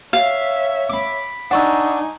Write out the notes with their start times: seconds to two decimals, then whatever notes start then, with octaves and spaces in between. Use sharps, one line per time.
0.13 C#5 E5 F5
0.89 B5 D6
1.51 D4 D#4 F#5 G#5 C#6 E6